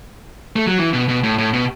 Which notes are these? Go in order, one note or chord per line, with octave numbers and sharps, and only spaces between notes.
A3
F#3
E3
B2
B2
A2
A2
B2